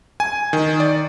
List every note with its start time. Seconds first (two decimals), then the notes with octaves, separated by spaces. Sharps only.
0.20 G#5
0.53 D#3
0.80 D5